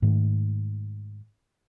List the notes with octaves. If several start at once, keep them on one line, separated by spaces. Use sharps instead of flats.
G#2 D#3 A3